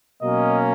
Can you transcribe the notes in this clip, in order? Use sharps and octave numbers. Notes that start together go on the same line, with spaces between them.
B2 F#3 A#3 C#4 D#5